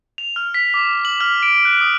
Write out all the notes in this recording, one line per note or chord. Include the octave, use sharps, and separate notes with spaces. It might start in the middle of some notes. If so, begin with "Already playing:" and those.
F7
F6
B6
D6
F#7
F6
D7
F#6
D#6